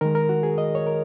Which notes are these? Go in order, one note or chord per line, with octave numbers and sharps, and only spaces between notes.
D#3 G#3 A#4
A#4
F#4
G#4
D#5
C#5
A#4